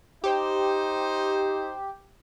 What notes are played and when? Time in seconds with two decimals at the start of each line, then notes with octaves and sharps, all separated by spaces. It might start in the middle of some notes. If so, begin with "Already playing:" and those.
0.24 D#4 G4 C5